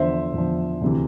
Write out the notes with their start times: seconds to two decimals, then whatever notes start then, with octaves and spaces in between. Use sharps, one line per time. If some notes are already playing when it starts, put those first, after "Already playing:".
Already playing: E2 D3 F3 C5 E5
0.34 E2 D3 F3
0.81 D2 C3 E3